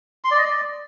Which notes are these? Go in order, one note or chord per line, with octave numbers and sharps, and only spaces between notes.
C6
D5
D#5
D5